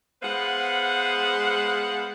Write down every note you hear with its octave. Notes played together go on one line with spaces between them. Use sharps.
G#3 B3 B4 C5 F5 F#5